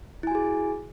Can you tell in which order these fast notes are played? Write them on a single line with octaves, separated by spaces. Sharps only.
E4 G#5 F#4 G#4